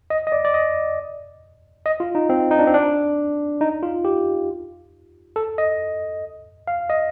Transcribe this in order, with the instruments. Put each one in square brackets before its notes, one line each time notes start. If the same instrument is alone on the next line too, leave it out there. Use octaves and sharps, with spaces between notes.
[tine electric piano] D#5
D#5
D5
D5
D#5
D#5
F4
D#4
C4
D#4
D4
C4
D4
D#4
F4
G4
A4
D#5
F5
D#5